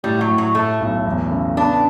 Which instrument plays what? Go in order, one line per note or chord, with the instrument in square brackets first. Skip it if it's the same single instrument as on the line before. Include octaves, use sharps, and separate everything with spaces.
[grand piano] A2 [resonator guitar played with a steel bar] G3
[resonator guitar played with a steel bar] F#3
[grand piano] A2
[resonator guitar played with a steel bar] F#3
[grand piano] A2 [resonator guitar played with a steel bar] A3
[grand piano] B1
E2
C#3
[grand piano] B3 [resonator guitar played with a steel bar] D4